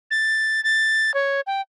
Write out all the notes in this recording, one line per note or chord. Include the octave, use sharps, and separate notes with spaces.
A6
A6
C#5
G5